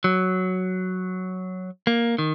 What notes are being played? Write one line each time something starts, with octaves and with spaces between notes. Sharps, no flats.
F#3
A#3
D#3